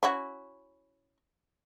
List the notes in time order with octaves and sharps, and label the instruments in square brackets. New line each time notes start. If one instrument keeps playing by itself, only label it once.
[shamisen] C#4 E4 F#4